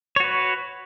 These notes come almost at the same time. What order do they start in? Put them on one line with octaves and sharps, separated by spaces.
C#5 F#4 B4